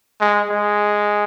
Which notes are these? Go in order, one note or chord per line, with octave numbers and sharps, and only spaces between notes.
G#3
G#3